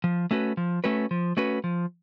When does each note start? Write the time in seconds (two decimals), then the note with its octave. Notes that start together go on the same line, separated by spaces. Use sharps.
0.04 F3
0.31 A3 C#4 F#4 B4
0.57 F3
0.84 A3 C#4 F#4 B4
1.11 F3
1.37 A3 C#4 F#4 B4
1.64 F3